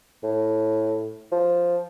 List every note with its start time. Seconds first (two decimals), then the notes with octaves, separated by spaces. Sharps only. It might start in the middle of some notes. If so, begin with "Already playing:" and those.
0.23 A2
1.32 F3